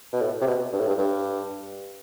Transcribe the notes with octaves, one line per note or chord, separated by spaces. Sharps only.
B2
A2
C3
B2
G2
A2
G2
G2